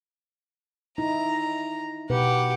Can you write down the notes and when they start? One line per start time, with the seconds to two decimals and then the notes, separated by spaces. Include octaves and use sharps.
0.98 D#4 E4 A#5
2.10 B2 G4 B4 F#5